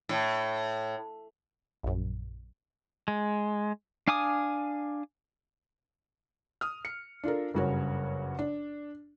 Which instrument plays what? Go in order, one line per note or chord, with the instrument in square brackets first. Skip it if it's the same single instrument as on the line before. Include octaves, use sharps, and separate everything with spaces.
[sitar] A2
[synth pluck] A#1 F#2
[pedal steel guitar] G#3
D4 F5 G#5 D6 D#6
[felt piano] D#6 F6
C#7
D4 F4 A4 A#4
F#1 G2 C#3 F#4 A#4 C#5
D4